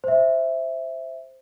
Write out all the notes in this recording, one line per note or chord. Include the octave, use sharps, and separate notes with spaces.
C5 E5